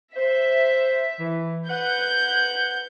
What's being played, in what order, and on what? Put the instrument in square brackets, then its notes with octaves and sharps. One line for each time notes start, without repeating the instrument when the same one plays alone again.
[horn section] C5 [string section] E5
[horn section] E3
[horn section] B4 F#5 [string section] G6